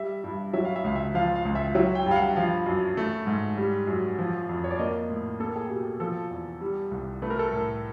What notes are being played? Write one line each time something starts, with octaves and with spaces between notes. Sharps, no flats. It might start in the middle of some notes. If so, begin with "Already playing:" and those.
Already playing: G3 E5
G2
F#3 E5
F5
E5
C#2 F5
E5
F3 F5
F5
C#2
E5
F#3 E5
G5
G2
F5
F#5
F3 F5
F#2
A3
G#2
G3
F#2
F3
F2
C#5
D5
A#3 D#5
A2
A#3 A4
G#4
B2 G4
A4
F3 A4
E2
G3
C2
A3 B4
A#4
A4
A2 A#4